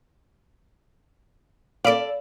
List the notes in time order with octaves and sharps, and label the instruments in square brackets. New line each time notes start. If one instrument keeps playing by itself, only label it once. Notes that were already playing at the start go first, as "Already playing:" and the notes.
[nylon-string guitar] A4 D5 [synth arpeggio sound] F5 B5 D6